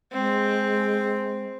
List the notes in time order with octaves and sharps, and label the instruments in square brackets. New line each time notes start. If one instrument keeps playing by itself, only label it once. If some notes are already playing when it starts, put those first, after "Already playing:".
[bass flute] G#3 [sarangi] C4